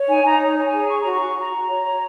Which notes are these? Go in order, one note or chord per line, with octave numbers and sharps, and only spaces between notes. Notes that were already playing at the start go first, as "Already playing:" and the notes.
Already playing: C#5
D#4 G#5
D#4 A#5
C#5
C#5 A#5
G#5
G#4
C#5 C#6
A#5
F#4
C#6
F#4
F#4 A#5
F#4
C#5
C#5